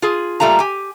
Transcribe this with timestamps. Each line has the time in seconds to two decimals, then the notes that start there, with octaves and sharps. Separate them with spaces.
0.02 F4 G#4
0.40 A#2 G3 A3 F4 A#5
0.59 G4 G#5